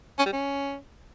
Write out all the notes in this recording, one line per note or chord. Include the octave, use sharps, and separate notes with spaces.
C#4
G3
C#4